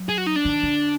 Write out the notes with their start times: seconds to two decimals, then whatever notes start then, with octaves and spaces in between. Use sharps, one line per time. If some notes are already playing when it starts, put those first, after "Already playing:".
Already playing: F#3
0.09 G#4
0.18 F#4
0.27 D#4
0.36 D4
0.45 D#3
0.63 D3